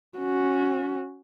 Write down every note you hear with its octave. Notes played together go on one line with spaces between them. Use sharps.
C#4 F#4